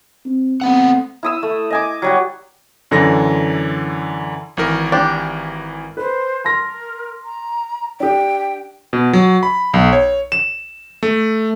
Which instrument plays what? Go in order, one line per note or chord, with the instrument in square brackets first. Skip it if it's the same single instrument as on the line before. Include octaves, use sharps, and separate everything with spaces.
[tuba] C4
[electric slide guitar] A3 B3 F#5 [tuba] C4
[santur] E4 D#6 E6
A3
D#5 G#5 D6
F#3 G3 F#4
[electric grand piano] F#2 D3 E3 A#6
G#1 E3 A#4
[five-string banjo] D4 G4
[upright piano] B4 [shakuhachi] C5
[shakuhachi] A#4 [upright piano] A5 C6 A#6
[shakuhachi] A#5
[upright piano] D4 G4 [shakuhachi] G5
[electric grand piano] B2
F#3
B5
B1
C#5
E7
A3